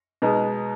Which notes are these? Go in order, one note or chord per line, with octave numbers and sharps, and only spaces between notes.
B2 G#3 B3 D#4